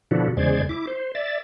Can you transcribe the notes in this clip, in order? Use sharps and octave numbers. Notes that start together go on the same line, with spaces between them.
B2 D3 F3 D4 E4 F#4
E2 C#3 G#3 C5 D5 G#6
E4 D6
C5
D5 E5 A6